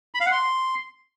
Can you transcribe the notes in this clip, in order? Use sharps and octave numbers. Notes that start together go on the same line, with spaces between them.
B5
F5
F#5
C6